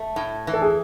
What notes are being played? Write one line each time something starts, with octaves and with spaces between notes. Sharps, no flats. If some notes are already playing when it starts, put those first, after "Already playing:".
Already playing: A3
A2
E3
A4
G#4